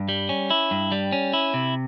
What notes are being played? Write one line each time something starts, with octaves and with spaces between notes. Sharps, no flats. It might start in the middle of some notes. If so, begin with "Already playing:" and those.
Already playing: G2
G3
C#4
E4
G2
G3
C#4
E4
C3